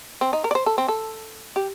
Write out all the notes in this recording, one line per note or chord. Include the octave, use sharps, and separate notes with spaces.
C4
D#4
A#4
D5
C5
A4
C4
A4
G4